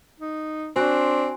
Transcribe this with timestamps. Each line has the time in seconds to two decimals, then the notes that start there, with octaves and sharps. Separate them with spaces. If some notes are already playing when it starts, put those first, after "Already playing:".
0.20 D#4
0.76 C4 D4 F#4 G#5 C6